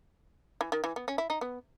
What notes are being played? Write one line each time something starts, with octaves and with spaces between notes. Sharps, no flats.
E3
D#3
E3
B3
C#4
E4
D#4
B3